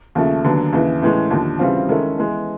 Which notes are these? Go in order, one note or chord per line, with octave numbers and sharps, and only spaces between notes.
D#2 C#3 F3 A3
D#2 D3 F#3 B3
D#2 C#3 E3
A2 E3 G#3 C#4
D#2 D3 F3
C#3 E3 G3 C4 F4
D#3 G#3 C#4 E4 A4
E3 G#3 B3